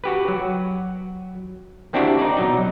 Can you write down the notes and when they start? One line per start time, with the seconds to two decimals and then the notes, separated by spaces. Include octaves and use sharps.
0.04 F#4 G4 B4
0.28 F#3
1.93 A#3 C4 D4 E4 F#4 G4
2.19 D#4 D5
2.37 B2 F#3 D#4